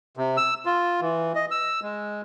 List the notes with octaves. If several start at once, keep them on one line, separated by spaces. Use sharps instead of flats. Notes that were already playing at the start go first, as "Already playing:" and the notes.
C3
E6
F4
E3
D#5
E6
G#3